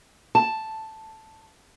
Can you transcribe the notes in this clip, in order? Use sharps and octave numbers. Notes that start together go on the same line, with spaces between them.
A5